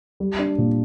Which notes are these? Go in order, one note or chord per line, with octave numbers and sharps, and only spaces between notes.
G3
D4
A#2